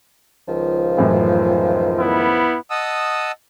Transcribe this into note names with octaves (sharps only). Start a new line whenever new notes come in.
C#2 D#3 F3
F#2 A2 E3
B3 E4
D#5 F#5 A5 D#6 E6